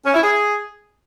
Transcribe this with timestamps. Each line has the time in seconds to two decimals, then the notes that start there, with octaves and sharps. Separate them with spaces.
0.06 C#4
0.14 E4
0.23 G#4